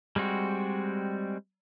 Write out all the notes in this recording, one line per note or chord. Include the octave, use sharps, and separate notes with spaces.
G3 G#3 C4 F#4